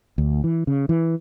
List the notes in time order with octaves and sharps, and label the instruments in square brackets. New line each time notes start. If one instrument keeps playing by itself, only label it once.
[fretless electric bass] D2
E3
C#3
E3